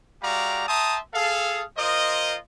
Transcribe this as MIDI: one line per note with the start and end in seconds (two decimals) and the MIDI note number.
0.23 0.68 56
0.23 0.68 66
0.23 0.68 67
0.23 0.68 74
0.23 0.68 77
0.23 0.68 82
0.68 0.98 76
0.68 0.98 79
0.68 0.98 81
0.68 0.98 82
0.68 0.98 84
0.68 0.98 87
1.14 1.63 68
1.14 1.63 69
1.14 1.63 77
1.78 2.37 65
1.78 2.37 70
1.78 2.37 72
1.78 2.37 75